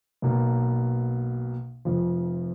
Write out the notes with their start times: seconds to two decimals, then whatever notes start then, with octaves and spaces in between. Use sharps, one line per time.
0.22 B1 B2 A#3
1.85 F1 F2 F3